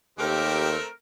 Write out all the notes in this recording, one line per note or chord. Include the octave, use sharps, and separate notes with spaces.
D#2 A3 C4 G4 A#4 D6